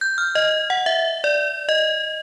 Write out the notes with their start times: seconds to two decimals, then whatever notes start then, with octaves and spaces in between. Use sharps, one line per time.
0.01 G6
0.18 F6
0.35 D#5
0.70 F#5
0.86 E5
1.24 D5
1.69 D#5